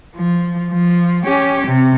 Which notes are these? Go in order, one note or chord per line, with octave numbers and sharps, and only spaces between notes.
F3
F3
C#4 G4
C3